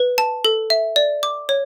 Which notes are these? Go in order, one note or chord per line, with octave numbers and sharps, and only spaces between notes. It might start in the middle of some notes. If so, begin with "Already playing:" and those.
Already playing: B4
A5
A4
E5
D5
D6
C#5